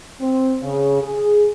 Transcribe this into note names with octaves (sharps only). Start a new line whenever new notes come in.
C4
C#3
G#4